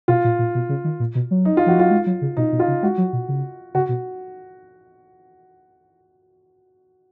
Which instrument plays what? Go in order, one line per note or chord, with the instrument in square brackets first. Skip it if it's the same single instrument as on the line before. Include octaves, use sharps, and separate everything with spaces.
[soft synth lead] B2 [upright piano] F4
[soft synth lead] A#2
A#2
B2
C#3
D#3
A#2
B2
F#3
[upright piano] D#4
F4
[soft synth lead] F3 [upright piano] F#4
[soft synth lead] F#3 [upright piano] F4
[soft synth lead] G#3
F#3
C#3
[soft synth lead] B2 [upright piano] D#4
[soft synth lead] B2
[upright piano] F4
[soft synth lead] C#3
[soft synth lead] G#3 [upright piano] F#4
[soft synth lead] F#3
B2
C#3
[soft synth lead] C#3 [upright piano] F#4
[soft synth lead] B2